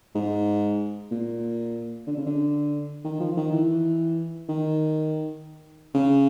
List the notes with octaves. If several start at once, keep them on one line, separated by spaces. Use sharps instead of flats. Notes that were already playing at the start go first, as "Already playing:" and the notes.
G#2
A#2
D3
C#3
D3
D#3
F3
D#3
E3
D#3
C#3